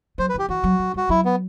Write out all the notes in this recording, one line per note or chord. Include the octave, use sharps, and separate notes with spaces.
F#3 C5
B4
E3 G4
E3 F#4
F#3
F#3
G3 F#4
F#3 E4
B3